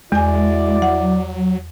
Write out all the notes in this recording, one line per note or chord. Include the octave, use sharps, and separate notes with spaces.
E2 G#3 E4 F#4 D5 G#5
F#3 F#5